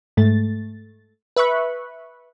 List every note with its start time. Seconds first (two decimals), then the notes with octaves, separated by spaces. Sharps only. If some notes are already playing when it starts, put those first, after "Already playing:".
0.17 G#2 A3 A6
1.36 B4 E5 B5 C#6 F#6